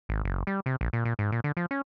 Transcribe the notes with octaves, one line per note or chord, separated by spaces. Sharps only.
G#1
F#1
G3
C3
A#1
A#2
A#2
G#2
A#2
D3
F3
C#4